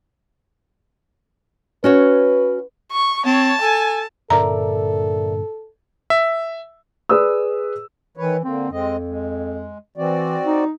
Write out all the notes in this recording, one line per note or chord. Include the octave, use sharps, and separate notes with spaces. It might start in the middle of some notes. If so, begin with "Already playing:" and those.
C#4 F#4 B4 C#5
C#6
C4 C#5 A5
A4 G#5
G2 A#2 D3 A4 A#4 D5 E5 A#5
E5
G#4 B4 D5 D#6 E6
D#3 E3 B4 C#5
D3 A#3 C4
F2 G#3 C4 D#5
G#3
E3 C4 F#4 D5
D#4